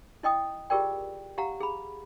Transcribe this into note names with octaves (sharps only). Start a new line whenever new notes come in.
E4 D#5 G5 D#6
F4 G4 G#4 A#4 D5 G5
G4 F5 F#5 A#5
G#4 B5